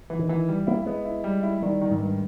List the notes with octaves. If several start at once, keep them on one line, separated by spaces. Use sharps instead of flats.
E3
D#3
E3
G3
A#3 E4
G#3 B3
E4
G3
E4
D#3 G3
D#3
G#2
G2